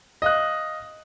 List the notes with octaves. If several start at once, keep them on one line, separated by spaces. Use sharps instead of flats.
D#5 F5 F#6